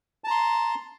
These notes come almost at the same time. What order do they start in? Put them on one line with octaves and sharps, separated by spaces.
A5 A#5 C6